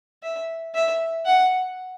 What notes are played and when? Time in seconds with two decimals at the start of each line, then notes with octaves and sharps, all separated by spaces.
0.23 E5
0.75 E5
1.26 F#5